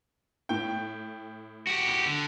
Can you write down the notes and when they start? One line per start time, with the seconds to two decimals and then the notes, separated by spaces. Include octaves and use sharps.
0.49 A2 G5
1.67 F#4 G4
1.88 C#7
2.06 D3